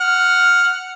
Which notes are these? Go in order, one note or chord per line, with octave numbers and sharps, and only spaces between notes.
F#5 F6